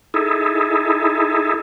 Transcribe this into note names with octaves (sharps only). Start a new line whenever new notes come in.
D#4 E4 G#4 A4